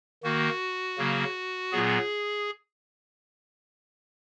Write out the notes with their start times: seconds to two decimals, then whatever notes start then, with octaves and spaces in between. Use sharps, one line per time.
0.23 D#3 A#3 F#4
0.98 C#3 F#3 A#3
1.72 A#2 F#3 B3 G#4